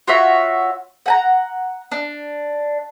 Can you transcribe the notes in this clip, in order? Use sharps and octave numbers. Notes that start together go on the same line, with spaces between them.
F4 F#4 C#5 E5
F#5 G#5 A#5
D4